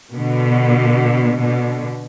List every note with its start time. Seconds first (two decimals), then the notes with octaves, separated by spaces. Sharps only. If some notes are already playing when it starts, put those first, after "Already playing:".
0.11 B2 D3
1.38 B2 D3